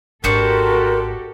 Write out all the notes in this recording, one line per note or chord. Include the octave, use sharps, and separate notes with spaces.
G#1 D4 F#4 G4 A4 A#4 C5 C#6